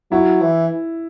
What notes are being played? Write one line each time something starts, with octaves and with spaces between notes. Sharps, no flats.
F#3 E4
E3